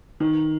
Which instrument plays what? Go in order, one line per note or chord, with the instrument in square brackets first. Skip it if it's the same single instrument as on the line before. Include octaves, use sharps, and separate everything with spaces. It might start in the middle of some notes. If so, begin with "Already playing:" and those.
[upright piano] D#3